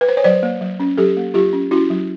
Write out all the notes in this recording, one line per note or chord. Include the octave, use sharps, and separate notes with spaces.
B4
C5
C#5
F#3 C5 D5
A#3
F#3
C#4
F#3 G4 A4
A#3
F#3 F4 G4
C#4
C#4 E4 F#4
F#3